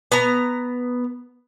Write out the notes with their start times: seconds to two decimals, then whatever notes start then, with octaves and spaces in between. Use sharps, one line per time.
0.12 B3 A#5